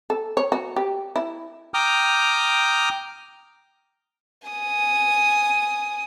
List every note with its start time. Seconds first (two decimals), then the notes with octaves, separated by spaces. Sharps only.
0.10 A4
0.37 C#5
0.52 F#4
0.76 G4
1.16 E4
1.74 G5 A#5 D6 D#6 F6 G6
4.48 G#5 D#6